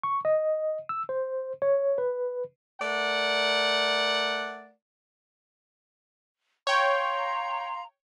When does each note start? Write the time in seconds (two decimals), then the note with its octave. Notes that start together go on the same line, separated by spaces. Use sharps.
0.03 C#6
0.25 D#5
0.89 E6
1.09 C5
1.62 C#5
1.98 B4
2.81 A3 A#4 D5 F#5
6.67 C#5 F5 G5 A#5 C6